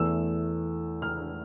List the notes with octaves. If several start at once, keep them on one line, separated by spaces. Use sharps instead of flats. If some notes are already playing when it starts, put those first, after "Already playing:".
Already playing: E2 E3 A3 E6
F6